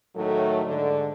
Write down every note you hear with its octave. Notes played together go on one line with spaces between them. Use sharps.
A2 D#3 F#3 A3
G#2 D3